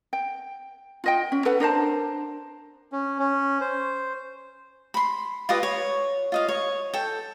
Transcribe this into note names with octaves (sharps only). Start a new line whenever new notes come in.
G5
F4 D#5 G5
C#4
A4 B4 F#5
D4 A#4 C5 A5
C#4
C#4
C5
B5 C6
F4 G4 B4 D#5
C#5
F4 D#5 F5
C#5
A4 G5